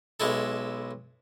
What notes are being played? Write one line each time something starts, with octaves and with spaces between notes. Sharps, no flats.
B1 G#3 E4 A4